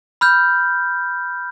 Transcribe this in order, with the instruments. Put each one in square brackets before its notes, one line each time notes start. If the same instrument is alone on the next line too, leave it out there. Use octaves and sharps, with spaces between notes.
[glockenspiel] B5 F6 G6